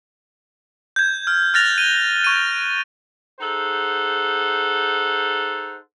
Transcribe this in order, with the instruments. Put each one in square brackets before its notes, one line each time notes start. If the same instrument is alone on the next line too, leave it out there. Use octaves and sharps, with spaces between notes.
[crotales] G6 G#6
F6
F6 F#6 A6 A#6 F7
D#7 G7
C#6 D#7
[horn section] D#4 G#4 A4 C5 F#5